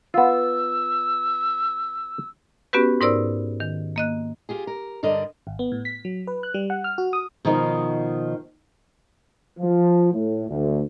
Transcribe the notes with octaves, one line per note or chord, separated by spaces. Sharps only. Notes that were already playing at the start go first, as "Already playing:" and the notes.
B3 F4 E6
B3 C#4 F#4 G4 B4
G#2 D#4 A#4 C5 D5 E6
D#3
A#3 D#5 F#6
F4 G4 G#4
A#4
G2 D3 A#4 D5 D#5
G#1
B3
A2
B6
F#3
B4
F#6
G3
F#5
F6
F#4
D#6
B2 D#3 F3 D#4
F3
A2
D2